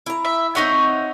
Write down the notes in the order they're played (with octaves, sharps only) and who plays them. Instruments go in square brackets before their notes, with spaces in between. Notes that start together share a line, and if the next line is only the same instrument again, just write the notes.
[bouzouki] E4 A#5
[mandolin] E5
[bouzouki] C4 F#4 E5 [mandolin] D#4 C#5 F#5